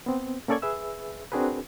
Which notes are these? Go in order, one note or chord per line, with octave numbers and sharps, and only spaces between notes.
B3 C4
A#3 C#4 A4 D5 C#6 G#6
G#4 B4 E5 E6
C4 D4 F#4 G#4 A#4 B4